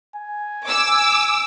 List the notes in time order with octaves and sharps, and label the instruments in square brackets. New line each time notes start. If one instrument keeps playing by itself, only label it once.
[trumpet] G#5
[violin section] D6 E6